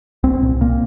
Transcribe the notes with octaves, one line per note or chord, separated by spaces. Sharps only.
C2 C4
A#2
A#2 A#3